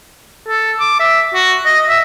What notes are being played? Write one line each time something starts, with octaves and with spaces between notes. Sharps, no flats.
A4
D6
E5
F#4
D#5
E5